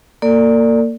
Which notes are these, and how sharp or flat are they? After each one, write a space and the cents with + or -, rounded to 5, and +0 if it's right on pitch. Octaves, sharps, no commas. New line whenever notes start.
A#3 -15 A4 +45 D5 +0